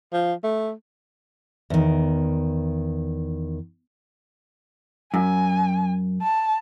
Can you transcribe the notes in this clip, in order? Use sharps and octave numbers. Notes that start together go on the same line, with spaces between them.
F3
A3
E2 D#3
F#2 G#5
A5